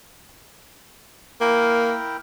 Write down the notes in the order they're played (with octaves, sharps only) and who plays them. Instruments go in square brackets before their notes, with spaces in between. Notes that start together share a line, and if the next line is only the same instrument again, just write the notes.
[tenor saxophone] A#3 [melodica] E4 A#4 G5